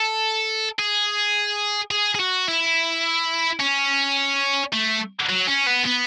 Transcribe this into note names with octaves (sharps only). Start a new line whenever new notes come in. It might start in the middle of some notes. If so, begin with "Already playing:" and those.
Already playing: A4
G#4
G#4
G#4
F#4
E4
C#4
A3
F#3
C#4
B3
B3